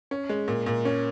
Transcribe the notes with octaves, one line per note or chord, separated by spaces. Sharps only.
C#4
G#3
A#2
A#2
C#4